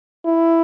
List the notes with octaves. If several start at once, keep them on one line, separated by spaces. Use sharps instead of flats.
E4